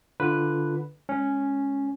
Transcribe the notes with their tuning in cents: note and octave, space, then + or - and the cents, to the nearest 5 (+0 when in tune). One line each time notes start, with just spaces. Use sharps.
D3 +0 F4 -15 B4 +0
G#3 +0 C#4 +0